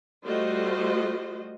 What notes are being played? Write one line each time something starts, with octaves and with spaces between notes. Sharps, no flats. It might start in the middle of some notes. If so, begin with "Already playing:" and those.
G3 A3 F4 F#4 C5 D#5